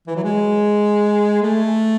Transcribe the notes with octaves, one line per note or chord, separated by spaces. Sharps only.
E3
F#3
G#3
A3